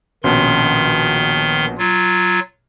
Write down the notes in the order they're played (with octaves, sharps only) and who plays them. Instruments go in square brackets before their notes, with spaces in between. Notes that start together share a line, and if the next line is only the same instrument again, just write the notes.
[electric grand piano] A#1 B2 C#4 [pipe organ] D#3 C6
[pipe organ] F#3 F4